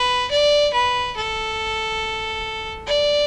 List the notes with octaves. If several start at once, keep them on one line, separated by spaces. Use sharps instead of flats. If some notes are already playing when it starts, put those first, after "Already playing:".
Already playing: B4
D5
B4
A4
D5